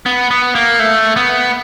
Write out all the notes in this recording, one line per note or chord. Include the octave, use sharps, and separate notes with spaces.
B3
B3
A#3
A3
B3